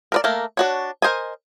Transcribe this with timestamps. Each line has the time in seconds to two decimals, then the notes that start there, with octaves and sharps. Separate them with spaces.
0.12 A#4 B4 D5
0.24 A3 A#3 A#4
0.57 D4 F#4 C#5
1.02 A#4 C5 D#5 G#5